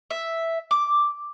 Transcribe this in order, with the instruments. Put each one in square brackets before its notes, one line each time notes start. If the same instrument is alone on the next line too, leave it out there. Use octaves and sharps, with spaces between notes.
[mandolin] E5
D6